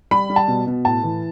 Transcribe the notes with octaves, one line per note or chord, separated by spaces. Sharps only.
G3 B5
G3
A5
B2
B2
A2 A5
E3